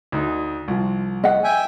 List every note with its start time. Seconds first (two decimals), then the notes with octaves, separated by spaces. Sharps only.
0.12 D2 D#4
0.68 C2 F3
1.24 D#5 F#5
1.44 E5 G5 G#5